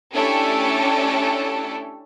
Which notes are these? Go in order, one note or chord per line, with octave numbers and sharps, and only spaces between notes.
A3 C#4 D4 E4 G4 A4